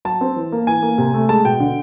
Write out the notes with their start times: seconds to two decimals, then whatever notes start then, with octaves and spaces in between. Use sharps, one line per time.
0.05 F#3 A5
0.21 C4
0.36 E3
0.52 A#3
0.67 E3 G#5
0.83 A#3
0.98 C3
1.14 A3
1.29 G#3 A5
1.44 B2 G5
1.60 D3